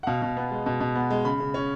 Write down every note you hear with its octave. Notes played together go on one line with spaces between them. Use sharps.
F#5
B2 F5
B2
B3
G#3
B2
B2
B3
G#3
C#3 B5
C#3
C#4